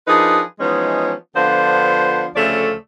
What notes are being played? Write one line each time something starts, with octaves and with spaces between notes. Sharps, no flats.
F3 D4 D#4 G#4 A#4 B4
E3 F3 G#3 B3 C#4 D#4
D3 F3 B3 D4 F4 C5
D2 C#3 F3 A3 A4 D5